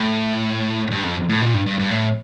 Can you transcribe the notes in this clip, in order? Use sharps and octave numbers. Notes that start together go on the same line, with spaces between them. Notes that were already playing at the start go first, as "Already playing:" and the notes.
Already playing: A2
G2
F2
A2
A#2
G2
G2
G2
A2